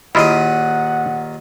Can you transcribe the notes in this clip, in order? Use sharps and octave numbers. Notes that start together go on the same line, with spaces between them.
D#2 A#2 E4 F4 G#4 D#5 F#5